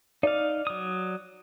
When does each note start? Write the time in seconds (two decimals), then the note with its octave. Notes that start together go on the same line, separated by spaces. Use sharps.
0.23 D#4 D5 F5
0.67 F#3 D#6